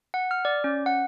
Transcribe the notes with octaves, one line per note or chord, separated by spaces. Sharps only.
F#5
F6
D5
C#4
F#5